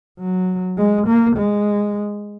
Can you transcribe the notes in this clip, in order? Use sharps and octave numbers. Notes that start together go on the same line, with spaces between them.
F#3
G#3
A#3
G#3